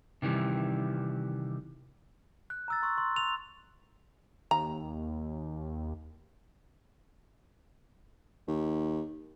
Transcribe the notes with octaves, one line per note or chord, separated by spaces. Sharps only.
C3 D#3 E3 G3
F#6
A#5 E6 A6
C6 C#6 E6
C6
C6 F7
D#2 A#5
D#2